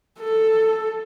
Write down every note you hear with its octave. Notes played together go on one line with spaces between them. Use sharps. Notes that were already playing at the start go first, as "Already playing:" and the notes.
A4